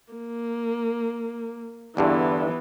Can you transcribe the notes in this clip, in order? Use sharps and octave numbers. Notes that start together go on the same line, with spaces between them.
A#3
E2 G2 D3 E3 B3